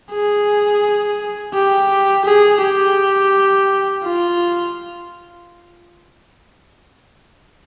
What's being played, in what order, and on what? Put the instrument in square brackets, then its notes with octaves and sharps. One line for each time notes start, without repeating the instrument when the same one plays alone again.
[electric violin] G#4
G4
G#4
G4
F4